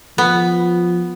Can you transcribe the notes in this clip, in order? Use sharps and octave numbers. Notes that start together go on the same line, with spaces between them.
F3 B3